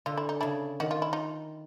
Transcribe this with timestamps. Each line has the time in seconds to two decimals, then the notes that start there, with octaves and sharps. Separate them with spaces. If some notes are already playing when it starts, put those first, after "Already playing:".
0.06 D3 F4
0.17 E4
0.29 D#4
0.41 C#3 D4 E4
0.80 D#3 F#4
0.91 F4
1.02 E4
1.13 D#4 F4